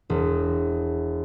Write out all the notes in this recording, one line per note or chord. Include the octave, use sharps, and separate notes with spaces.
E1